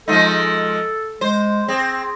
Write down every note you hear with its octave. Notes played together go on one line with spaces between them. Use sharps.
F3 G#3 D#4 A4
G#3 C5
C4 G#4